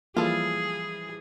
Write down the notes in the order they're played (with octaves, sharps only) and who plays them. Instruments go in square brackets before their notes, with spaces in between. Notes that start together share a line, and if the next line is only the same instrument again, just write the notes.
[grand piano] E3 F3 G3 [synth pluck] A#3 [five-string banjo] F4 A4 [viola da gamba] G#4